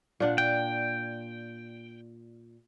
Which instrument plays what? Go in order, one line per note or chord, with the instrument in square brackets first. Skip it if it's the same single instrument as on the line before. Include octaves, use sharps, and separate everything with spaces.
[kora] A#2 D4 F#5
[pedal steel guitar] G5